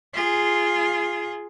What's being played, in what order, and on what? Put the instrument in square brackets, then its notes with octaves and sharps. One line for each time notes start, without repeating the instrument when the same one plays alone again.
[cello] F4 G#4